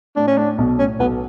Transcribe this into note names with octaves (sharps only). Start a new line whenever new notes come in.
A2 D4
C#4
A2 D4
B1 B2
A2 C#4
B1 B2 B3